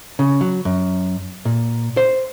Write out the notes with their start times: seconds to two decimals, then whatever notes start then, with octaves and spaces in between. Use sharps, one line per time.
0.19 C#3
0.41 F#3
0.65 F#2
1.45 A#2
1.97 C5